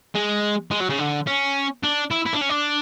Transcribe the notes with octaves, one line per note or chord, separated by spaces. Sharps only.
G#3
G#3
F#3
C#3
D3
C#4
D4
E4
E4
D4
C#4
D4